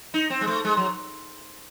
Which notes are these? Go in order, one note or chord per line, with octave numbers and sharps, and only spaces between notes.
D#4
C4
G#3
A3
G#3
F#3